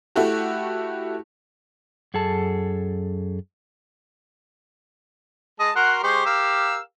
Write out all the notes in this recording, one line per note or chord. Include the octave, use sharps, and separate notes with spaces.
A3 E4 F#4 G4
F#2 G#4 A4 A5
G#3 D#5 A5
F#4 A#4 F#5 C6
G#3 G4 C5 C#6
A#4 F5 E6